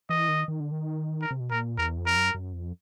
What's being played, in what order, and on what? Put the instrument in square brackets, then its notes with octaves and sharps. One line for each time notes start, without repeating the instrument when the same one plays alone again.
[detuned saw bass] E3 [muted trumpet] D#5
[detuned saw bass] D#3
D#3
D3
D#3
[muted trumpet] A#4
[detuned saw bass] C3
B2
[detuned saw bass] A#2 [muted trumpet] A#4
[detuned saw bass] E2 [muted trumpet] A#4
[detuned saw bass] F2
[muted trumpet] A#4
[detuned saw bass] F#2
F#2
F2